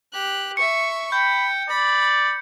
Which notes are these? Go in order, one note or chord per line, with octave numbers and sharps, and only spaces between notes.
G4 F#6
E5 C#6 C#7
G5 B5 G6
D5 B5